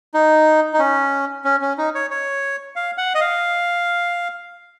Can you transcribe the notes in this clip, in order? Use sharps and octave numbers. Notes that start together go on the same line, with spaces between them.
D#4
D#4
C#4
C#4
C#4
D#4
C#5
C#5
F5
F#5
D#5
F5